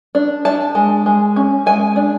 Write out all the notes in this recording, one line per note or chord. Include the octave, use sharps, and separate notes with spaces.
D4
D4 A5
G#3
G#3
C#4
G#3 G#5
D4